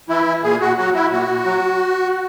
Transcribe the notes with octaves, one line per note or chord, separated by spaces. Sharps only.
E3 E4
A#2 G#4
F#4
F#3 F#4
E4
A#2 F#4
F#3